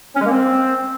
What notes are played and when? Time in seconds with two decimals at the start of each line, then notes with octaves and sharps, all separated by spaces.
0.15 C#4
0.21 G#3
0.26 A#3
0.31 C4